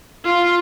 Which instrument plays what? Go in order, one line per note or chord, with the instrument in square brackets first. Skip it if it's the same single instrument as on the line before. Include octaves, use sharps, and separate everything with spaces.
[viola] F4